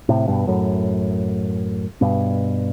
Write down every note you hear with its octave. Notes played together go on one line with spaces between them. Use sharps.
A2 C3
G2 B2
F#2 A2
G2 B2